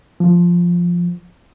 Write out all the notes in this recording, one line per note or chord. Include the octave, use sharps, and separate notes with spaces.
F3